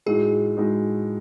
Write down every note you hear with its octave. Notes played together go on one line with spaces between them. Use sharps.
A2 G#3 D#4 F#4 G#4
A2 G#3 D#4 F#4